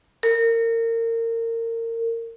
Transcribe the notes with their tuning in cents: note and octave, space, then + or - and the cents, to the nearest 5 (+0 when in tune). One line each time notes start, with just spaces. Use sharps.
A#4 -30